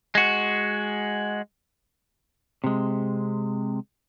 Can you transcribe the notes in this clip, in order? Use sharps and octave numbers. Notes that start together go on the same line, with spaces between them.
G#3 F#4
C3 G#3